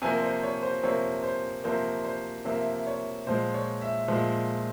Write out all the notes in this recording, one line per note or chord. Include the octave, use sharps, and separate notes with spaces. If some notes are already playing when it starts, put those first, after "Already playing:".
C3 F3 A#3 G#5
C5
C#5
C5
C3 F3 A#3 C#5
C5
C3 F3 A#3 C5
C5
C3 F3 A#3 E5
C#5
A#2 F3 G#3 C5
C#5
E5
A#2 F3 G#3